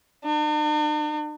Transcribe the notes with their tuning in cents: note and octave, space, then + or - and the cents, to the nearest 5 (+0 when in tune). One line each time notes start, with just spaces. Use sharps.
D4 +45